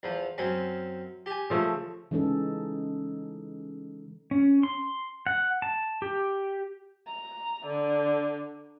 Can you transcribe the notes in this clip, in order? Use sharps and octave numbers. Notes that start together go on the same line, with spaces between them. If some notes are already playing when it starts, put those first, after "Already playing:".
E2 F3
F#2 C4 C#4
G4 G#5
C#3 F3 A3
C#3 E3 G#3 C#4 D#4 A4
C#4
C6
F#5
A5
G4
A#5
D3